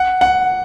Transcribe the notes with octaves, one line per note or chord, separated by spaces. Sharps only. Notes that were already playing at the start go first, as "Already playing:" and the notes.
Already playing: F#5
F#5